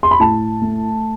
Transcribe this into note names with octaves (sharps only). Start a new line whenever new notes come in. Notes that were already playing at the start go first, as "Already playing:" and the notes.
C6
B5
A2 A5
A3